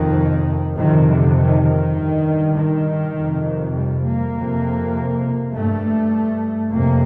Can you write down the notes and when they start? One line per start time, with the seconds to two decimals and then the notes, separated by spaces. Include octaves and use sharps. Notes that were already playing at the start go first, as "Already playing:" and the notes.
Already playing: F2 C3 D#3
0.75 F2 C3 D#3
1.05 D3
1.35 D#3
1.65 D#3
1.95 G2
2.55 D#3
3.14 F2 C3
3.74 G3
4.04 A#3
4.34 F2 C3
5.53 G2 A3
6.72 F2 C3 A#3